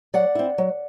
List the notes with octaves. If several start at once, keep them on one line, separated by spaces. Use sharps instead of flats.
F#3 D5 F#5
C4 E4
F#3